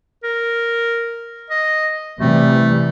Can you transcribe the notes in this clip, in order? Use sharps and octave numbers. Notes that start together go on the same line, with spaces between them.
A#4
D#5
C3 E3 G3 A3